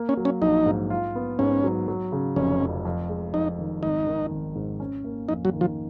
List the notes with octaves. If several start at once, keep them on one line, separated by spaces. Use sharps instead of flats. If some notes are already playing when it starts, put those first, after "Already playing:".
Already playing: A#3
C#4
F#3
C#4
A#1 D#4
G#2
F4
B3
G#2 C#4
F#3
F#3
C#3
F1 C#4
F2
F2
G#3
F2 D#4
D#3
G#1 D#4
D#3
G#1
G#2
C#4
A#3
F2 D#4
F#3
D#3
F3